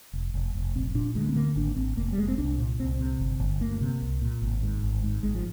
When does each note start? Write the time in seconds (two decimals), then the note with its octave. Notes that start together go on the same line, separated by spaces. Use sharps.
0.13 F1
0.34 F1
0.55 F1
0.75 A#1 C4
0.94 A#2 D4
1.15 D2 G#3
1.29 C4
1.35 D3 A#3
1.56 G#1 D4
1.76 G#1 C4
1.97 F1 A#3
2.12 G3
2.18 F1 G#3
2.28 C4
2.38 C2 D4
2.58 A#2
2.79 C2 C4
2.99 C3
3.20 G1
3.40 G1
3.60 D2 A#3
3.81 C3
4.02 C2
4.22 A#2
4.42 G#1
4.62 G#2
4.83 G#1
5.03 G#2
5.23 G#1 G#3
5.34 F3